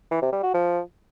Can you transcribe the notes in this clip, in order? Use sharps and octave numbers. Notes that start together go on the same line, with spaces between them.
E3
C3
G3
F#4
F3